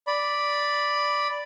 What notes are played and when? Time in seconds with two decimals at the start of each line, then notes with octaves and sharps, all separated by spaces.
0.07 D5 B5